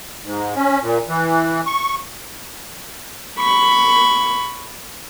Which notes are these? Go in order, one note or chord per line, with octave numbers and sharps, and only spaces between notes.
G#2
C#4
A#2
E3
C#6
B5 C#6